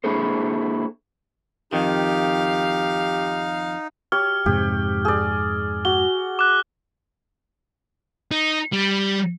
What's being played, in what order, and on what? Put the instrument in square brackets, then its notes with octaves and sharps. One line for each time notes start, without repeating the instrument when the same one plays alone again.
[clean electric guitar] A#3 D4 E4 G#4 A4 C5
[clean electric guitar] F2 D#3 [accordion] D#4 [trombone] G4 [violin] F5
[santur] G4 C#5 [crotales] F6
[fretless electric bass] F2 G#2 C3 [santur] G4
[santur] G#4 D5
[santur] F#4 [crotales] G7
[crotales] D6 F#6
[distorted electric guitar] D#4
G3